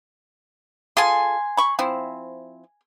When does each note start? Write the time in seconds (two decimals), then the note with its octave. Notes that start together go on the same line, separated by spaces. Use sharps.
0.97 F4 G#4 A4 G#5 C6
1.57 B5 C#6
1.79 F3 C4 E4